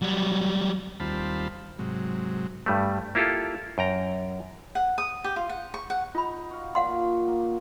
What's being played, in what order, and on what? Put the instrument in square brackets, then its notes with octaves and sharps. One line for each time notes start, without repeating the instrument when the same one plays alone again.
[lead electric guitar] F#3 G3
[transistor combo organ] D#2 G3 C4 F4 A5 B5
G#2 C3 F#3
[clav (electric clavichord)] G2 G3 A3
A#3 E4 F4 G4 A4
F#2 G5 A#5
[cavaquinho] F#5
D#6
G4
F4
F#5
C#6
F#5
[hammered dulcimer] D#4 [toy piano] F4 B5
[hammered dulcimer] F#4 F5
[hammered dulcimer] A#2 [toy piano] F5 F#5 C6
[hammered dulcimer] A#3